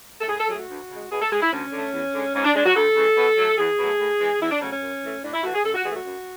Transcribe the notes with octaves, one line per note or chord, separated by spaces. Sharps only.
A4
A2 G#4
A4
F#3 A3 G#4
F#4
D2
C#3 G#3
B2 G#4
A4
G#3 G#4
E4
D2 C#4
D3 A3
E2
D3 G#3
G#2 C#4
D4
G#3 D4
F#4
D2 A4
C#3 E3 G#3
B2
F#3 A3
E2 G#4
B2 F#3 A3
A2
E3 G#3
E2 E4
D4
C#3 F#3 A3 C#4
C#4
F#2
E3 A3
A2 D4
E4
E3 A3 F#4
G#4
F#2 A4
F#4
E3 A3 G#4
F#4
F#2